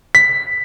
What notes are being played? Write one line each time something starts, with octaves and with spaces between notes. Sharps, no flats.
B6